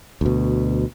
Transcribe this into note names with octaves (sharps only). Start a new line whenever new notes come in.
D2 B2